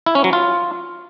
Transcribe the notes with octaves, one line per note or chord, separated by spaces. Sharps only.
E4
C#4
F#3
F4